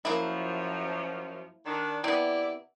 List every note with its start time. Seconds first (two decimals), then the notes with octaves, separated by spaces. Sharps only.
0.05 F#2 F3 A#3 E4
1.66 D#3 D4
2.04 C3 B3 E4 G4 D5